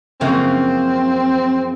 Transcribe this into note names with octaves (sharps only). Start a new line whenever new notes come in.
F#2 C#3 F3 A#3 C4